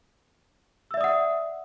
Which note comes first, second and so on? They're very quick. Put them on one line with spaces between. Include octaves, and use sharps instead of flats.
E6 E5 D5 D#6 F#5